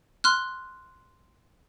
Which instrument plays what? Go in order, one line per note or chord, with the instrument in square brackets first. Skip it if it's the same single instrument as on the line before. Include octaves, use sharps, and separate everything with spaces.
[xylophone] C6 F6 F#6